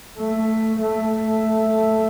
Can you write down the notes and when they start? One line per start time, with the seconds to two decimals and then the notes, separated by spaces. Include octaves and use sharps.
0.18 A3
0.81 A3